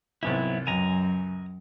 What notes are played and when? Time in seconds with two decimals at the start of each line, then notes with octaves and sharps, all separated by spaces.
0.23 C2 G#2 E3 F#3 B3 E4
0.67 C#2 F#2 G#5 A#5